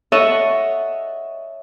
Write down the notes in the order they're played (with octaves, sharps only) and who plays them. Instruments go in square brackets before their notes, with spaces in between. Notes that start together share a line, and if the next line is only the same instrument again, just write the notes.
[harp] A4 C#5 D#5 E5 F#5